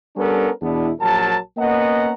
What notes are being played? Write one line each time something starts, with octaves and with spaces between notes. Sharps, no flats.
G3 B3 C#4 D4 A4 A#4
E2 B2 B3 D4 E4
A#1 F#3 A#4 A5
A#3 B3 C#4 D#5 F#5 A#5